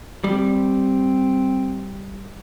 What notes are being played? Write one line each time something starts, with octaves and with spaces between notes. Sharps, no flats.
G3 C4